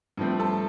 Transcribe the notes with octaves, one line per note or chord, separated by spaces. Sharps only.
G2 F3 A3 C4
A4 A5